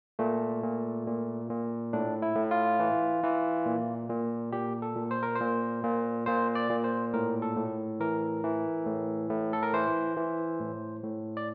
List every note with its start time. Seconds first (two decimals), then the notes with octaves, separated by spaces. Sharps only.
0.19 A#2 A3
0.63 A#2
1.07 A#2
1.50 A#2
1.93 A2 D4
2.22 E4
2.36 A2
2.51 F4
2.80 E3
3.23 E3
3.66 A#2
4.10 A#2
4.52 A#2 G4
4.82 A4
4.96 A#2
5.11 C5
5.23 A#4
5.36 A#2 C5
5.83 A#2
6.26 A#2 C5
6.55 D5
6.70 A#2
6.84 C5
7.13 A2 A#4
7.42 A4
7.56 A2
8.00 E3 A#4
8.44 E3
8.86 A2
9.30 A2
9.53 A4
9.63 A#4
9.74 E3 C5
10.16 E3
10.60 A2
11.03 A2
11.37 D5